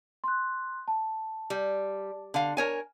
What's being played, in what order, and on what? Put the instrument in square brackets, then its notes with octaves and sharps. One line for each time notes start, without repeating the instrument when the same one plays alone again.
[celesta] C6 F#6
A5
[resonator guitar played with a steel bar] G3
D3 F5
A#4 C#5 G#5